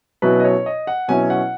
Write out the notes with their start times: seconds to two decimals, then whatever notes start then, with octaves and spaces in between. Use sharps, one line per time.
0.22 B2 F#3 C#4 E4 B4
0.40 D#5
0.44 C#5
0.66 D#5
0.87 F#5
1.08 B2 F#3 C#4 E4 G#5
1.30 F#5